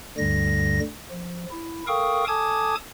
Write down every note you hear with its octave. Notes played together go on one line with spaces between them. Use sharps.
D2 G2 D3 G3 A#6
F3
E4
A4 A#4 F5 G5 C#6 D#6
A4 G#5 A5 D6 D#6 G#6